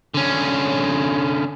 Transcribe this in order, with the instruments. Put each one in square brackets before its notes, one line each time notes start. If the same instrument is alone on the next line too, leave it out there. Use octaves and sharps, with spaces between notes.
[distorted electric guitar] D3 C#4